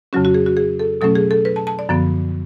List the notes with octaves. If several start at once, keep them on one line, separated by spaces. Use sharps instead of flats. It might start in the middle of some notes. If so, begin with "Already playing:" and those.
F2 C#3 F#3 C#4 F#4
F#4
G#4
F#4
G#4
A4
B2 F#3 A3 C#4 A4
G#4
A4
B4
A5
A5
D5
F#2 D3 F3 B3